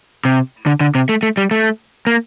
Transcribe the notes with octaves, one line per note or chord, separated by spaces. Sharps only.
C3
D3
D3
C3
A3
A3
G3
A3
A#3